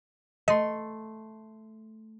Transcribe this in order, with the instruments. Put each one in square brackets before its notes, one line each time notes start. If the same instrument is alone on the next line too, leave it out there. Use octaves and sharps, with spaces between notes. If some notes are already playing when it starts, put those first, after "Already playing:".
[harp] A3 C6 [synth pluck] D#5